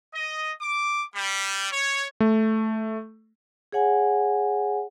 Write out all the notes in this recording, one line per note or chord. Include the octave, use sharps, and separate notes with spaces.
D#5
D6
G3
C#5
A3
G#4 C#5 F#5 G#5